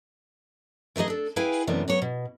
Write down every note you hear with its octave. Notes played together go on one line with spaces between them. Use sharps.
E3 A3 D#4 G#4 D#5
D4 A4
E4 G#4 B4 F5 G5 G#5
F#2 C3 E3 A3 B3 D4
F#3 B3 C#5
B2